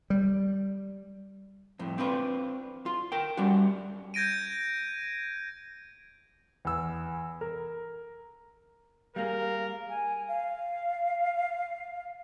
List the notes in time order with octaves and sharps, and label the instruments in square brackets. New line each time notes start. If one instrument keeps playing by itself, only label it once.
[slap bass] G3
[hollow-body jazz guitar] F2 A2
C4 D4 F4 B4
F4
A#4 G5
G3 C#4 F#4
[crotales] G6 G#6 A#6 D7 D#7
[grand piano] E2 E6
A#4
[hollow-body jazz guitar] G3 A#3 G#4 [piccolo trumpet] A#4 [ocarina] F5
[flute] G#5
F5